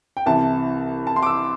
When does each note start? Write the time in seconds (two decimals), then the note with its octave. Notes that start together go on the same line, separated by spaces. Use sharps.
0.17 G5
0.26 C2 C3 E3 A5
1.07 A5
1.16 C6
1.23 D6
1.26 E6